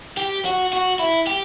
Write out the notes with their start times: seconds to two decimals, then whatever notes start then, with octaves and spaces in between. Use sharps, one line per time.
0.17 G4
0.45 F#4
0.73 F#4
1.00 E4
1.27 G4